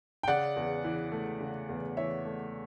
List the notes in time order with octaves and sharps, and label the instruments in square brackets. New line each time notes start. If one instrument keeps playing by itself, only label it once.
[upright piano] G5
C#3 D5 F#5
E2
E3
A3
C#3
E2
E3 C#5 E5
A3